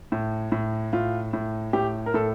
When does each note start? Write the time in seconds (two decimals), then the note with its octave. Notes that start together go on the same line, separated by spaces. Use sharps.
0.12 A2
0.52 A2
0.93 A2 F4
1.33 A2
1.73 A2 G4
2.06 A#4
2.14 A2 A4